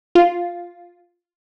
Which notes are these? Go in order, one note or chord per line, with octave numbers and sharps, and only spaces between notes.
F4